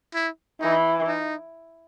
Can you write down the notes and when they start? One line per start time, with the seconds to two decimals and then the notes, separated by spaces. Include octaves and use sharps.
0.14 E4
0.61 E3 D#4
1.07 D#4